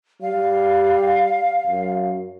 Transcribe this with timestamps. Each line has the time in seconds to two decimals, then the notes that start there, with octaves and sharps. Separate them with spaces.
0.21 G3 F5
1.67 F#2